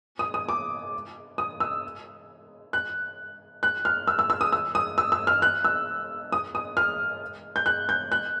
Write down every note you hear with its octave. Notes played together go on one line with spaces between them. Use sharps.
D#6
D#6
D6
D#6
E6
F#6
F#6
F6
E6
E6
E6
D#6
E6
D#6
E6
E6
F6
F#6
E6
D#6
D#6
F6
G6
F#6
G6
F#6